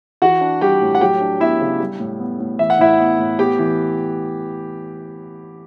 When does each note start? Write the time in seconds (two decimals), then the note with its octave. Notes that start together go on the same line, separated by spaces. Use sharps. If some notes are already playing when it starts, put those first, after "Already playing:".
0.22 E3 F#4 F#5
0.41 D4
0.61 G3 G4 G5
0.82 A2
0.95 F#5
1.01 F#3 G4 G5
1.21 D4
1.40 B3 E4 E5
1.60 C#3
1.80 G3
2.00 A2
2.19 B3
2.40 A2
2.59 E3 E5
2.70 F#5
2.79 A2 E4 E5
2.99 B3
3.19 A2
3.39 B3 G4 G5
3.59 E3